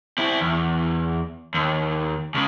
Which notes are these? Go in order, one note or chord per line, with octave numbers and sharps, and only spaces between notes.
C4 E4
E2
D#2
C#2 C#3